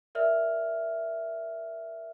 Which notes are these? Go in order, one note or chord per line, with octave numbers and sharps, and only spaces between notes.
A#4 D5 E5 F6